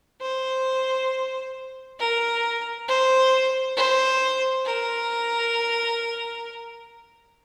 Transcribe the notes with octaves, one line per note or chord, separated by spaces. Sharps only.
C5
A#4
C5
C5
A#4